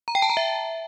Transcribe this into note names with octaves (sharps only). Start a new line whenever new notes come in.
A#5
G5
A5
A#5
E5